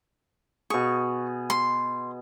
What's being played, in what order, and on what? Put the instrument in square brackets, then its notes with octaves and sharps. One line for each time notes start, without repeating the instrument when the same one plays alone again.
[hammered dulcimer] B2 G#4 [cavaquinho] C#6
[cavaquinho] C6